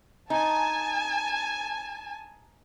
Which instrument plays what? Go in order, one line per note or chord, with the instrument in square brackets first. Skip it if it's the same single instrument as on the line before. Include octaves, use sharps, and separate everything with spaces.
[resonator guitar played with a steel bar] D#4 [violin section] G#5 A5